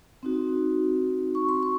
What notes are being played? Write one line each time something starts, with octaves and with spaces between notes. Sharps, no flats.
C4 D#4 F#4
C#6
C6
C#6